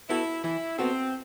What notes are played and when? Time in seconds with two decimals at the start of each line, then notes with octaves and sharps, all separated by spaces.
0.09 B3 E4 F#4 A4
0.44 E3 E4
0.78 B3 C4 F#4 A4